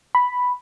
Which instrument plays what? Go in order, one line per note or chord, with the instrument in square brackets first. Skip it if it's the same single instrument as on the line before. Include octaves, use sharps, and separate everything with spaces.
[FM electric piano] B5